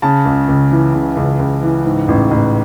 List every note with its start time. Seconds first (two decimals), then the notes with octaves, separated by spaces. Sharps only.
0.02 C#3 A5
0.25 C#2
0.48 C#2
0.72 E3
0.94 C#3
1.17 C#2
1.39 C#2
1.63 E3
1.85 G#2
2.08 A1
2.31 A1